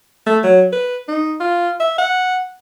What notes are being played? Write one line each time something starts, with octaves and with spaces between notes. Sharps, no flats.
A3
F#3
B4
D#4
F4
E5
F#5